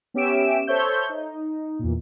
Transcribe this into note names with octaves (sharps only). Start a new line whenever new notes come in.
B3 C#4 G4 E5 D7 E7
A4 C5 C#5 E5 G6
D#4
E2 A#2